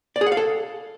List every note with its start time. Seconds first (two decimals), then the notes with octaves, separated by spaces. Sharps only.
0.16 D5
0.21 G#4
0.26 F#5
0.32 F5
0.37 A4